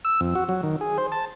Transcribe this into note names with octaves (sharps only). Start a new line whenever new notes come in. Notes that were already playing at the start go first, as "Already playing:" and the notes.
E6
F2
F#4
F#3
D#3
G#4
C5
A5